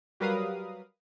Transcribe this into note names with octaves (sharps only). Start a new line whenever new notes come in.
F#3 G3 A#4 B4 F5 D#6